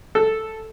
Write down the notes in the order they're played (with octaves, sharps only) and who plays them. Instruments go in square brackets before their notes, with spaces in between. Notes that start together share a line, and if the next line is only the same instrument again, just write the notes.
[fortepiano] A4